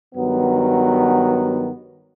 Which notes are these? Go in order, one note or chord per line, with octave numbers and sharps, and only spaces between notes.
G2 D#3 F#3 B3